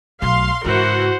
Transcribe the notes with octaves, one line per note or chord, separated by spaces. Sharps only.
B1 A3 F5 C6
G#2 C#3 E3 F#4 A#4 C5 F#5